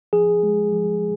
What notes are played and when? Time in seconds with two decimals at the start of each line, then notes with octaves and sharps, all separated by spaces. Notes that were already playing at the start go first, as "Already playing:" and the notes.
0.13 F3 G#4
0.43 G#3
0.72 F3